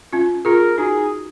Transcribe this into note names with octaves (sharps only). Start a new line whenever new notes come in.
C#4 F4
F4 G#4 A#4
D#4 F#4 G#4